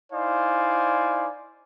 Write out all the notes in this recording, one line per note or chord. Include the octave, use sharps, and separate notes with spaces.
D#4 E4 C5 D5 F5 G#5